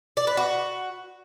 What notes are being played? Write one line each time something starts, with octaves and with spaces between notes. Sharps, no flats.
D5
B4
F#4